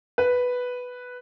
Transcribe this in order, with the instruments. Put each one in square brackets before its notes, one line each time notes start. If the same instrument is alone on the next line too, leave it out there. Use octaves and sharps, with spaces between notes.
[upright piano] B4